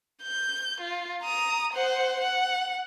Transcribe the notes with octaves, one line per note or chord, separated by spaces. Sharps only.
G6
F4
A#5 D#6
C5 F#5
F#5